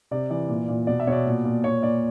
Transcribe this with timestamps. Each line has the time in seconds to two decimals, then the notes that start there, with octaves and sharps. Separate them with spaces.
0.11 C3 D5
0.30 E3 D5
0.48 A#2
0.68 A#2
0.87 B2 D5
1.00 E5
1.07 B2 C#5
1.12 D5
1.26 A#2
1.44 A#2
1.64 A#2 C#5
1.82 A#2 D5